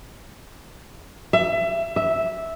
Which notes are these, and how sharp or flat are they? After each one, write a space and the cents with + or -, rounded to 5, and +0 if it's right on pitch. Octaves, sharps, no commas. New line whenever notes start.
E5 +25
E5 -5